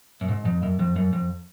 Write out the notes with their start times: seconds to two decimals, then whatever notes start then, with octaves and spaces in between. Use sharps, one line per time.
0.21 F#2
0.29 G#2
0.45 F2
0.63 F#2
0.79 F2
0.96 F#2
1.13 F2